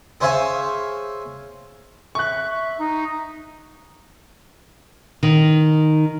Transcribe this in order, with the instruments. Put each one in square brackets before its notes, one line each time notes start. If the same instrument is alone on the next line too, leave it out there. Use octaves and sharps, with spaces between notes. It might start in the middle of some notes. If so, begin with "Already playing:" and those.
[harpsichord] G#4 C5 C#5 E5 F5 G#5
[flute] E5 [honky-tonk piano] C#6 F#6
[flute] D#4
[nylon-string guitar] D#3